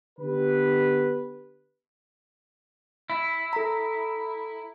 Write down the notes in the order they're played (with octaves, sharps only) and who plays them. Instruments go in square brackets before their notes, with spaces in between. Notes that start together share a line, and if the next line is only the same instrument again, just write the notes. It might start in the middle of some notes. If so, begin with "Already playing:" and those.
[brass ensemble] D3 B3 G4 B4
[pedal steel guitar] E4
[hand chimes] A4 A#5